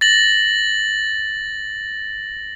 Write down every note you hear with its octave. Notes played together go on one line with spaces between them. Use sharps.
A6 A#6 F#7